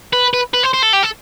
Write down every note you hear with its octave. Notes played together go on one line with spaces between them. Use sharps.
B4
B4
B4
C5
C5
A4
G4
A4